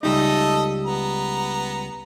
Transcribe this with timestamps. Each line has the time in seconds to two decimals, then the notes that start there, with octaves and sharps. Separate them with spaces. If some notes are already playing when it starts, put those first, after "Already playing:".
0.03 C#2 G3 A3 D#4 A4 D#5
0.86 B3 A#5